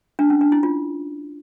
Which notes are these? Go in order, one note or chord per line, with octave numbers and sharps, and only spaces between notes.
D4
C#4
D4
E4
F4